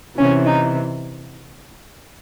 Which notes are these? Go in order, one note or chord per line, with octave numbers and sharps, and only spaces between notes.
C3 E3 C#4
D#4